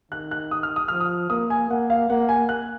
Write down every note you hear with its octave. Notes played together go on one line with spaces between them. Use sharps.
D#3 F#6
F#6
D#6
F6
D#6
F3 F6
D#6
A#3 D#6
G#5
A#3 F#5
F5
A#3 F#5
G#5
F#6